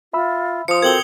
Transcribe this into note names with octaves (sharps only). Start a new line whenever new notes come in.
F4 E5 B5 E6
F3 C6 D#6 C#7
C4 F#4 A4 A#4 G#6 F#7 G7